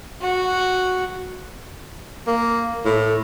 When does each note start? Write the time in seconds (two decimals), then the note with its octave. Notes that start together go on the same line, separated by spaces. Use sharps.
0.22 F#4
2.27 A#3
2.85 A2